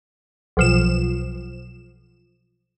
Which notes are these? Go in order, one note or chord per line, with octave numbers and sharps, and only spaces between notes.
B1 F3 E7